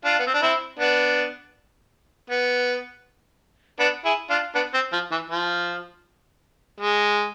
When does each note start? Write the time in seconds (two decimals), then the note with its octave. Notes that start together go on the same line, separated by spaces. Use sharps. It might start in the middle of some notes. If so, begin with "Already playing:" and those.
0.05 D4 F4
0.19 B3
0.27 C4
0.34 D4
0.42 C4 E4
0.79 B3 D4
2.30 B3
3.79 B3 D4
4.05 E4 G#4
4.30 D4 F4
4.55 B3 D4
4.74 C4
4.92 F3
5.11 E3
5.30 F3
6.80 G#3